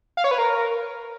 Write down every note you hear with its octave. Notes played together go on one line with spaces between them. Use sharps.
F5
C#5
B4
A#4